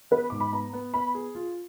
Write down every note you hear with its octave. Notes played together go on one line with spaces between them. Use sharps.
B3 B4
G#2 D6
B5
B3 A#5
B3
B3 B5
G#4
F4